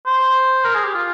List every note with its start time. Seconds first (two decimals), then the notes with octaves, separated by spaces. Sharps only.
0.06 C5
0.64 A#4
0.75 G#4
0.84 G4
0.94 F4